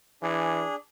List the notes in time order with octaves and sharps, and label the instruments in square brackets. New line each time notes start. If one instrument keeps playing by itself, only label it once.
[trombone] E3 [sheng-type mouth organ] D4 G#4